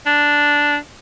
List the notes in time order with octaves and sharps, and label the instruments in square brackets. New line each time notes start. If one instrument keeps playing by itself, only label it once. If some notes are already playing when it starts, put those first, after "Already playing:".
[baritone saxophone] D4